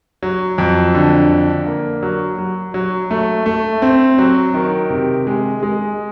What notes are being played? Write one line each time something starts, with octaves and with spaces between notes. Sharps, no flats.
F#3
F2
D3
D3
A#3
F#3
F#3
F#3
A3
A3
C4
F#3
D#3
C3
G#3
G#3